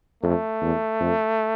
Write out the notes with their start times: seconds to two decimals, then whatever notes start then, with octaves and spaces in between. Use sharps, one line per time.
0.23 F2 A3
0.61 E2
1.00 F2